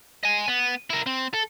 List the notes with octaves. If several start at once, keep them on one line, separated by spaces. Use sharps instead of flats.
D#5 G#5
B3
E4 A#4
C4
A4